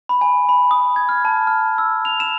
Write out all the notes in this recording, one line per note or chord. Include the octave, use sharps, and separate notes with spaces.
B5
G#5
B5
D#6
G#6
F6
A5
F6
E6
F7
E7